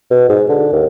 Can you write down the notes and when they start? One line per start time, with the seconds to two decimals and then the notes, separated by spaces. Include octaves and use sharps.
0.11 B2
0.29 G#2
0.49 D3
0.72 D#2